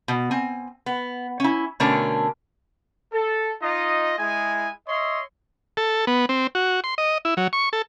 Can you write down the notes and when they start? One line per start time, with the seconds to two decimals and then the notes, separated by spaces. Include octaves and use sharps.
0.08 B2
0.31 C4 G#5
0.86 B3
1.40 C#4 E4
1.80 B2 D3 A3 C#4 D4 A#4
3.13 A4
3.61 D#4 F4 D#5
4.19 G#3 E4 G#4 G#5
4.88 C#5 D#5 E5 C6
5.77 A4
6.07 B3
6.29 C4
6.55 F#4
6.84 C6
6.98 D#5
7.25 E4
7.37 F#3
7.53 C#6
7.73 A4